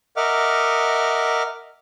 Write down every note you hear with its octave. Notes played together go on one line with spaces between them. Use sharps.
A#4 D#5 E5 F#5 D6 F6